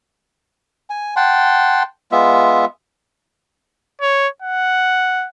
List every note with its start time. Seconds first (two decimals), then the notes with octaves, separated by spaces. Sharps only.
0.90 G#5
1.16 F#5 G5 A5 C6
2.12 G#3 B3 F4 E5
4.01 C#5
4.42 F#5